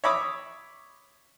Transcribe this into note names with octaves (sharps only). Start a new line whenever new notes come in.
C#5 E5 B5 D6 D#6